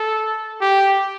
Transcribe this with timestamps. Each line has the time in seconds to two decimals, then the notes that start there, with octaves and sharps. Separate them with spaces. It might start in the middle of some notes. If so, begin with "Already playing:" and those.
Already playing: A4
0.61 G4